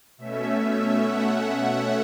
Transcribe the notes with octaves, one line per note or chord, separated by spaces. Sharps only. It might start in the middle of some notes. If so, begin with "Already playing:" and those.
B2 A3 C#4 E5
F#5
F#5